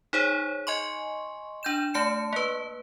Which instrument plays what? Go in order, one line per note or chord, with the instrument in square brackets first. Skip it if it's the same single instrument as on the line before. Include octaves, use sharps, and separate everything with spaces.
[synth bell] D#4 G#4 C5 C#5
D#5 G#5 C6 C#6
D4 G6 E7
A3 A5 C#7
A#3 B4